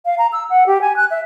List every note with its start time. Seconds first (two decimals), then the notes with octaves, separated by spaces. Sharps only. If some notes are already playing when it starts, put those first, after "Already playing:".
0.05 F5
0.18 A#5
0.33 E6
0.50 F#5
0.67 G4
0.81 G#5
0.96 F#6
1.11 E5